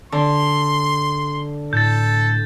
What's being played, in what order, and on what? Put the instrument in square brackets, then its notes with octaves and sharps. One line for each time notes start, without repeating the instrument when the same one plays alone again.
[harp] D3 [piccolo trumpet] C6
[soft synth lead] A2 [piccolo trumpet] A4 [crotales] G6 A6